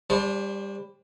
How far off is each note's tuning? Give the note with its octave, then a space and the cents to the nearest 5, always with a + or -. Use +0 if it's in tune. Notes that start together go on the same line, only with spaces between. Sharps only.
G3 +20 D4 -25 C5 +25